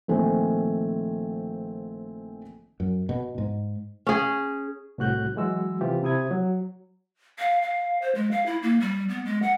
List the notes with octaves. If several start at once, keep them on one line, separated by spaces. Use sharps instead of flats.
A#1 D#3 A3 C4 G#5
F#2
B2
G#2
C#4 G#4
C2 A2 F#4 F#6 G6
E3 F#3 G#3 F#4 E6
C3 E3 F4 G4
C3 E4 D#6 G#6
F#3
F5
F5
C5
G#3
F5
E4
A#3
G3
B3
G#3
F#5